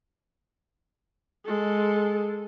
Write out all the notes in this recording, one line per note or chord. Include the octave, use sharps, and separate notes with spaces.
G#3 A4